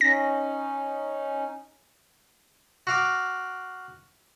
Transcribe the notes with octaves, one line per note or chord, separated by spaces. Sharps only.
C#4 D#4 A#6
F#4 F5 D6